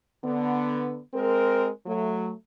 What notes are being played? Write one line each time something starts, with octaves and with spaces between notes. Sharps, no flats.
D3 B3
G#3 C4 A#4
F#3 A3